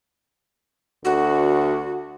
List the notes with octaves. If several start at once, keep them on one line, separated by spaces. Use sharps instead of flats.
D2 F#4